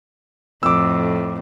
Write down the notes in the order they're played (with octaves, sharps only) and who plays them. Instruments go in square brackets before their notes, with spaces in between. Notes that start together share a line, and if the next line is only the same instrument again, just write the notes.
[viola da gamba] F2 A2 [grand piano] D6 E6